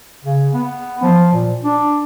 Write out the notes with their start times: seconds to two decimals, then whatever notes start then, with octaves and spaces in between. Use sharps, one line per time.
0.25 C#3
0.53 B3
1.03 F3
1.33 A#2
1.64 D4